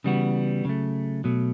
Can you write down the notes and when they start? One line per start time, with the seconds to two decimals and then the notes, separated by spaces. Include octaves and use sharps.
0.04 C#3 E3 G3 B3 F#4
0.65 C#3 F#3 A3
1.24 B2 F#3 A3